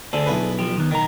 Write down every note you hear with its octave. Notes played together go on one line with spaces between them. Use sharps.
D2 D4 G#4 A4
B1 E4 B4
F3 G4
D#3 B3
B1 D#3 A#5